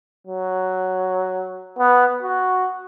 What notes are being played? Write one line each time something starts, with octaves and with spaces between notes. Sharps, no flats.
F#3
B3
F#4